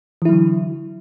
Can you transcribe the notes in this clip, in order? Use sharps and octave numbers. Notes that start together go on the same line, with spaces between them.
D3 E3 F#3 E4